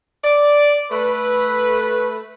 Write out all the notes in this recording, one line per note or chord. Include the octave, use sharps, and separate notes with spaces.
D5
A3 B4